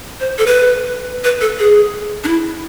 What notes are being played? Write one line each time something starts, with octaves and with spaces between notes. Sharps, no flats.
C5
A4
B4
B4
A4
G#4
D4
E4